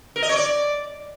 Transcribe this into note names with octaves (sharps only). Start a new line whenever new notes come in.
A#4
D#5
C#5
D5